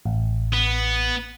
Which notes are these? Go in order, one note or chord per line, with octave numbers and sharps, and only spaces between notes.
A1
B3